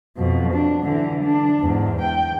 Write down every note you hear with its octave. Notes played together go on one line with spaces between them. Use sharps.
F2 B2
D4
D3 E3
D4
E2 G#2
G5